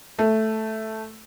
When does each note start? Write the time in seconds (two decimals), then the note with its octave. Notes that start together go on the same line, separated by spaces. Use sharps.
0.19 A3